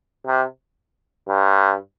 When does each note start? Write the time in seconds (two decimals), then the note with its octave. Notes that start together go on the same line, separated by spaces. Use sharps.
0.27 C3
1.28 G2